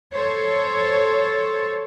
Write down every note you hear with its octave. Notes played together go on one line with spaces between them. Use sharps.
A4 C5 C#5